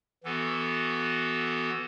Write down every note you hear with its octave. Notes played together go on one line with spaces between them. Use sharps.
E3 B3 F#4 A4